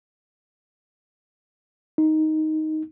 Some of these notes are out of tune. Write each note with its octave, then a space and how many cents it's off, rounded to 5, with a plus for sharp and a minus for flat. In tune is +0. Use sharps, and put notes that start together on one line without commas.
D#4 +5